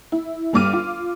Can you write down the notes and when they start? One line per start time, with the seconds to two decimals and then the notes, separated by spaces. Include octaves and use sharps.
0.12 E4
0.53 G1 G2 G3 D6 F6 D#7
0.73 F4